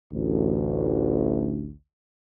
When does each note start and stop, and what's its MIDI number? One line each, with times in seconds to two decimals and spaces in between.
0.13 1.73 33
0.13 1.73 38